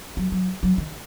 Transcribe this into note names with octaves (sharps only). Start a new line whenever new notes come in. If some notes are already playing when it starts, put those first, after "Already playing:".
F#3
F#3
F#3
D#3